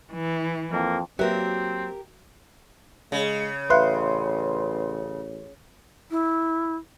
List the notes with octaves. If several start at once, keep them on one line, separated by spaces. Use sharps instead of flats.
E3
F2 A#3
F#3 A#3 C4 F#4 G4 A#4 B4 E5
C#3 G#3
A1 B4 E5 F5 C6 F#6
E4